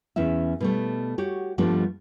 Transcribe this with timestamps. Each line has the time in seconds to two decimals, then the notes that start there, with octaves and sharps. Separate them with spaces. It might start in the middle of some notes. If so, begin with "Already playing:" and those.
0.16 E2 C#4 E4 E5
0.60 B2 G3 A3
1.18 F#4 G4 C#5
1.58 G2 F3 G3 A3 B3 D4